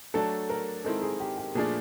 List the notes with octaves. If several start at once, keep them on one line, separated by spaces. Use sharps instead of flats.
F#3 A3 D4 A4
A#4
D#3 G#3 C4 E4 A4
G#4
G4
G4
A#2 F3 A3 D4 G#4